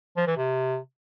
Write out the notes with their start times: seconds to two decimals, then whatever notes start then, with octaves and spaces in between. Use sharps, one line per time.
0.17 F3
0.27 E3
0.37 C3